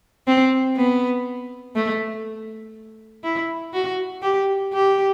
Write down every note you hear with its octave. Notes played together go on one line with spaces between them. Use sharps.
C4
B3
A3
E4
F#4
G4
G4